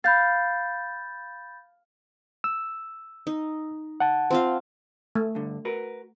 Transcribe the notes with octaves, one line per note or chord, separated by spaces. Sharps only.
F5 B5 G6 A6
E6
D#4
F#5 A5
C4 F4 F5
A3
G2 D3
F#4 A#4 B4